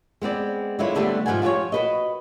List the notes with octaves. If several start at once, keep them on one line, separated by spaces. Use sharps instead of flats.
G#3 B3 C4 D5
D3 G#3 E4 F4 C#5
D3 G3 A3 B3 C4 D4
G#2 F3 A3 C5 F#5 G#5
F3 F4 G4 B4 C#5
F#4 B4 D#5